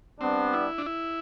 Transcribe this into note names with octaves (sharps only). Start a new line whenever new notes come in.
G3 B3 C4 D4
E4
D4
E4